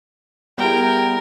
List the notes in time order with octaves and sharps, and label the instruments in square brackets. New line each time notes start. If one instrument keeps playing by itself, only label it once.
[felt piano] G3 G#4 [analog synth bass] B3 [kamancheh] E4 G5 [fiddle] A#4